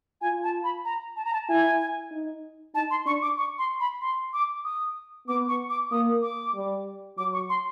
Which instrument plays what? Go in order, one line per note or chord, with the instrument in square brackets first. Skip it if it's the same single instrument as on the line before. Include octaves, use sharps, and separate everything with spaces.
[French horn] F4 [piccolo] G#5
[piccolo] A5
B5
A#5
A5
A#5
A5
[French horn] E4 [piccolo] G#5
[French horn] D#4
[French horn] D#4 [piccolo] A5
[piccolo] C6
[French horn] D4 [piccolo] C#6
[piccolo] D6
C#6
C6
B5
C6
D6
D#6
[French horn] B3 [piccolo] D6
[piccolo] C#6
D6
[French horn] A#3 [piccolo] D#6
[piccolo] D6
[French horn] G3
[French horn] F#3 [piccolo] D6
[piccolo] C#6
C6